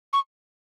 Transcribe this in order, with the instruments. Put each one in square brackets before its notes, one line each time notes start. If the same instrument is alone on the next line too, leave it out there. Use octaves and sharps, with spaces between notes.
[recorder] C#6